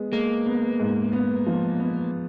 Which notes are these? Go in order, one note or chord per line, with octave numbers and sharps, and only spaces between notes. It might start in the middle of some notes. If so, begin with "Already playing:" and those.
Already playing: G#3 B3
G#3 A#3
B3
G#2
B3
F3
B3